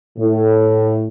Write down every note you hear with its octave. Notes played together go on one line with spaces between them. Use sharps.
A2